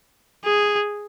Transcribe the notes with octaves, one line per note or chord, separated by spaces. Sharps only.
G#4